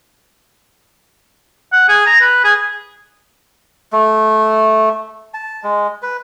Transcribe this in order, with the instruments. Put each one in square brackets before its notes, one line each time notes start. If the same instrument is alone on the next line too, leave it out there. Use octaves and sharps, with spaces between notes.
[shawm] F#5
G#4
A#5
B4
G#4
[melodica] A3
A5
G#3
B4